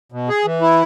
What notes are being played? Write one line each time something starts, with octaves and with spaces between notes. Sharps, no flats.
B2
G#4
E3
E4